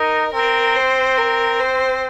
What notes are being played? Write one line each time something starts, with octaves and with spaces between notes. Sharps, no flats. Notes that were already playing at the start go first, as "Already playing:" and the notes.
Already playing: D#4 A#4
C4 A#4
C5
A#4
C5